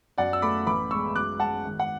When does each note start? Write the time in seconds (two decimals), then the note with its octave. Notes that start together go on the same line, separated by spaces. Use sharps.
0.18 F#2 D5 F#5
0.33 E6
0.42 A3 B5 D6
0.67 A1 B5 D6
0.91 G#3 C#6 E6
1.15 F#2 D6 F#6
1.40 G#3 F#5 A5
1.65 G#1
1.80 F#5